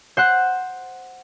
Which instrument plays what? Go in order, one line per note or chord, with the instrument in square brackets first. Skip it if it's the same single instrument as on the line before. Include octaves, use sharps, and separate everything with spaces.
[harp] C5 F#5 F#6